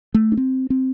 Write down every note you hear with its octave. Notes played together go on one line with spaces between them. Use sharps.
A3
D4
C4
C4